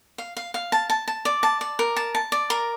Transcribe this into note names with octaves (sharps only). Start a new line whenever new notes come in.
F5
F5
F5
A5
A5
A5
D5
A5
D5
A#4
A5
A5
D5
A#4